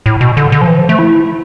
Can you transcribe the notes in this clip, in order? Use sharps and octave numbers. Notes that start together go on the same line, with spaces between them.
A2
B2
D3
D3
F3
E3
F3
A3
E4